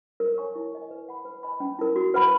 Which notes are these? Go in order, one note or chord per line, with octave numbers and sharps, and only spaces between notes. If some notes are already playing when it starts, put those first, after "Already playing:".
A#4
C#5 G#5 C#6
E4
A#4 D#5 G#5
B4
F#5 B5
B4
D#5 G#5 B5
C#4
E4 A#4
F#4
B4 F#5 B5